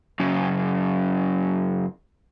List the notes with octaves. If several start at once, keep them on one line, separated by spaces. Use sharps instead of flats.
F#2 C#3